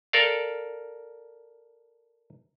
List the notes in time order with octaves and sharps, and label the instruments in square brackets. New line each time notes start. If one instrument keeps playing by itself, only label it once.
[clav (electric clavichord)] A4 A#4 D5 F5